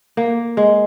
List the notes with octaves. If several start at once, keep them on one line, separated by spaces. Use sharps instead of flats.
A#3
G#3